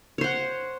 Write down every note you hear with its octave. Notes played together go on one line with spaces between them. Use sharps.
C5 C#5 F#5